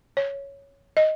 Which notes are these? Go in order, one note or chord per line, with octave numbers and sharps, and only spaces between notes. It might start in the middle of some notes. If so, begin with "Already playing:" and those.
C#5
D#5